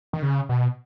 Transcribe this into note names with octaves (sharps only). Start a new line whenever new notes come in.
D#3
C#3
B2